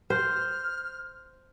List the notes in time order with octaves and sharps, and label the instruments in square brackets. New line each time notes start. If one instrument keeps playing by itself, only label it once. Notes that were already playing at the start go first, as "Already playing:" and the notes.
[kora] C5 [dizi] F6